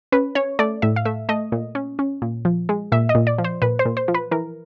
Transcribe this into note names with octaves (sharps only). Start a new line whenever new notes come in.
C#4 B4
C#4 C#5
A3 D5
A2 E5
F5
A3 E5
A3 D#5
A#2
C#4
C#4
A#2
F3
G#3
A#2 E5
D#5
A#2
D5
F3
C5
A#2 B4
C5
A#2
C5
F3
B4
E3 A#4